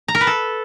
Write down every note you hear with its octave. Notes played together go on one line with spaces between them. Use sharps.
A#5
A#4
B4
A4